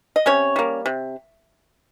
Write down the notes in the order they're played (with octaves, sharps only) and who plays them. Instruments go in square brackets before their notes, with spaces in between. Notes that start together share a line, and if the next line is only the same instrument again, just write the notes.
[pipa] D#5
C3 C#4 C#5
G3 A#3
C3